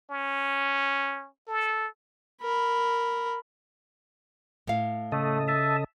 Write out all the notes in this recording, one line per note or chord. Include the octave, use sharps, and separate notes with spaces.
C#4
A4
A#4 B5
A2 F5
C#3 A3 A4 D#5
E5 A5